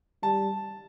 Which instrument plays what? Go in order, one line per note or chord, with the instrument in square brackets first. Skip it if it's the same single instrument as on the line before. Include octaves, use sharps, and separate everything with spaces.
[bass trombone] G3 [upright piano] A5